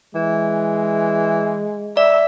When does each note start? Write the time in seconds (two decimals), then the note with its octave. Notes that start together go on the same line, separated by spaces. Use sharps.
0.15 E3 G#3
1.97 D5 E5